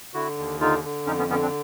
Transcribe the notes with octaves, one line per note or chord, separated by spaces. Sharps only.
D3 E4 F#4
D#2
D3 D#4 F4
D3
F2 C#4 D#4
B3 C#4
D3 B3 C#4
C4 D4